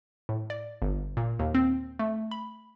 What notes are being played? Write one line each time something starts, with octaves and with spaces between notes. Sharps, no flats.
A2
D5
G1
A#2
D#2
C4
A3
B5